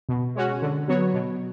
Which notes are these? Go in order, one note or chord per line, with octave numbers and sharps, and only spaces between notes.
B2
G#3 C#4 F#4
D3
F#3 B3 F#4 C#5
B2